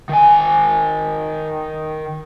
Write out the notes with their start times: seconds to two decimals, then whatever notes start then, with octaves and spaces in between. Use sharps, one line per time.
0.09 D#3 G#5